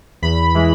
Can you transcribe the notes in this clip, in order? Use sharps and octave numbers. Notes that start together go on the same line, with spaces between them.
E2 B5
E3 G#3